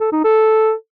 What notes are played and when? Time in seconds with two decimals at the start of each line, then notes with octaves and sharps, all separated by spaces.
0.01 A4
0.12 D#4
0.24 A4